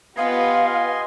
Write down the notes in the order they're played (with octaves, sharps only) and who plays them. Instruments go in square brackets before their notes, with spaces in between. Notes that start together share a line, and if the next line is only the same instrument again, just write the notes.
[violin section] B3 F4 G4 [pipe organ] D#5 G#5 C6 [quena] F5